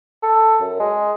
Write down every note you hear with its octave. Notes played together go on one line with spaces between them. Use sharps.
A4
F#2
G#3